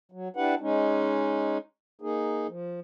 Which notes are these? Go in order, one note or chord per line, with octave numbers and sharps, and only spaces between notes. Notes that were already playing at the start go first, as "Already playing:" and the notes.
F#3
D4 E4 G4 B4 F#5
G#3 C#4 D#4
A#3 D#4 G#4
F3